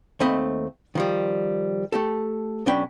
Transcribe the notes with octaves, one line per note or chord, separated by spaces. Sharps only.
D#2 A3 C4 D#5 B5
D#3 F3 G3
A3 G4 A4
B1 F#3 C#4 D4 G5 B5